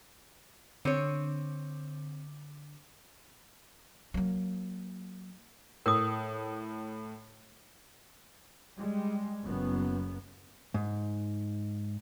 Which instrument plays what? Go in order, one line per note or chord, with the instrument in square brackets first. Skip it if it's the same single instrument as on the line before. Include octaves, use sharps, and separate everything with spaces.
[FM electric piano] D3 [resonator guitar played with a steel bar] C4 C#5
[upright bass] F#3 A#3
[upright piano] A2 [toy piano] A#4 D#6
[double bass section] G3 G#3
F#1 F#2 B3
[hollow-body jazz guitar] G#2